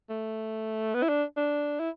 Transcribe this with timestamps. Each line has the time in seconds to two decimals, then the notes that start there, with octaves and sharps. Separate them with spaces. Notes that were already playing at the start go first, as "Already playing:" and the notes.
0.10 A3
0.94 B3
1.03 E4
1.09 D4
1.37 D4
1.80 E4